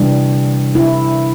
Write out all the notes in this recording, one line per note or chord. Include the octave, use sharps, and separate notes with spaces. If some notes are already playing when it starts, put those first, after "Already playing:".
Already playing: C3 E3 G3 D4
E4